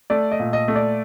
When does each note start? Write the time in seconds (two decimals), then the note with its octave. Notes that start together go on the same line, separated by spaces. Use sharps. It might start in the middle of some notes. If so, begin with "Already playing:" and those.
0.10 A3 D5
0.32 D#5
0.39 A#2
0.53 D#5
0.68 A3
0.76 D5